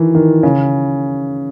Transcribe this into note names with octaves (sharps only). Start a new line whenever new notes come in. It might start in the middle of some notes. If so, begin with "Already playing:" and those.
Already playing: D#3 E3
D#3
C#3